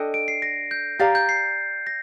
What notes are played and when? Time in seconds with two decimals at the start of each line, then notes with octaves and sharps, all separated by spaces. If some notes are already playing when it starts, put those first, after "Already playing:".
Already playing: D4 A4 D#5 G5
0.14 D7
0.28 C7
0.42 A#6
0.71 G6
0.99 G4 D5 F5 A#5 A6
1.15 G6
1.29 C7
1.87 A#6